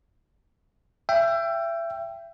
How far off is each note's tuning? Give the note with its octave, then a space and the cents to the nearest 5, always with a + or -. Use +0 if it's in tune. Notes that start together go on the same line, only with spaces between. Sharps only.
E5 +30 G5 +0